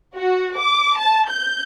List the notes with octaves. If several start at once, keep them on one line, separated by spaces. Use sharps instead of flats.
F#4
D6
A5
G6